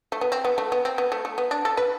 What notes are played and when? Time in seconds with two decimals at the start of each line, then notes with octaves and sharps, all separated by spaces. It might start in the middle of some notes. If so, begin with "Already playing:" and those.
0.12 A3
0.21 B3
0.32 C4
0.45 B3
0.58 A3
0.72 B3
0.85 C4
0.98 B3
1.12 A3
1.25 A3
1.38 B3
1.51 D4
1.65 A4
1.77 B4